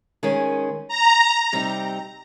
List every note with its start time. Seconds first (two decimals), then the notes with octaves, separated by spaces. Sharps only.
0.23 D#3 G#3 C#4 G#4
0.88 A#5
1.53 C3 G3 C4 D#4 G4